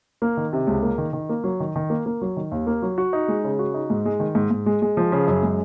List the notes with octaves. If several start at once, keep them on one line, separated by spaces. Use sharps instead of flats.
A#3
D#3
C3
C#2
A#3
D#3
D#3
A#3
F#3
D#3
D#3
A#3
A#3
F#3
D#3
D#2
A#3
F#3
F#4
D#4
G#3
C#3
F#4
D#4
G#2
G#3
D#3
G#2
G#2
G#3
G#3
F3
C#3
F#2
G#3